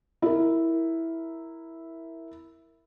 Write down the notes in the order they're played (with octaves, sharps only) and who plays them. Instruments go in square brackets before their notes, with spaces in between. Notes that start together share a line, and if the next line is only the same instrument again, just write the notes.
[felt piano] E4 A#4